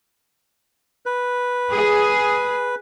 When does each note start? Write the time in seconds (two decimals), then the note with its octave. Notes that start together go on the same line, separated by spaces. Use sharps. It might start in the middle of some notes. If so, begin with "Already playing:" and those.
1.06 B4
1.70 G#4